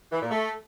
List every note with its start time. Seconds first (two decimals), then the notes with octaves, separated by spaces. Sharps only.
0.12 E3
0.21 A#2
0.31 A3